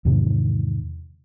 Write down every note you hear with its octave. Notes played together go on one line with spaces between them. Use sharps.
E2 G#2 C3 D#3